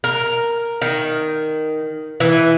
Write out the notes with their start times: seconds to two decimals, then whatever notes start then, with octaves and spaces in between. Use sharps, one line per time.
0.04 A#4
0.81 D#3
2.20 E3